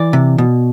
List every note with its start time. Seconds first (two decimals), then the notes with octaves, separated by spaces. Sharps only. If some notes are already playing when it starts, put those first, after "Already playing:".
Already playing: E3 D5
0.13 C3
0.38 B2